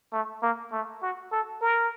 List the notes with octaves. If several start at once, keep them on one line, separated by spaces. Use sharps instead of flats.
A3
A#3
A3
F#4
A4
A#4